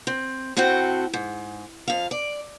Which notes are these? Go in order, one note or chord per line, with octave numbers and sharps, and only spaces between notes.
C4
A2 C4 F#4 A4 G5
G#2
F2 F5
D5